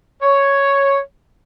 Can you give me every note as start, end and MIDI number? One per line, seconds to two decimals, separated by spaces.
0.22 0.99 73